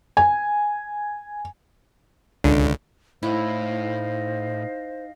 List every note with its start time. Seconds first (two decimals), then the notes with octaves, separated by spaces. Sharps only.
0.17 G#5
2.44 C#2 D3
3.23 A2 D#4 E4 C5 D#5 F5